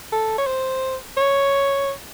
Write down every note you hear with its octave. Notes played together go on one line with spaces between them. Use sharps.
A4
C#5
C5
C#5